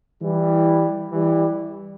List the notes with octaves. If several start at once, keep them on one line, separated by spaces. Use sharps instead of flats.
E3 G3
E3 G3